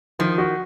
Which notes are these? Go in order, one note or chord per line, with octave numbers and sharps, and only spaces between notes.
D#3 F3
F#4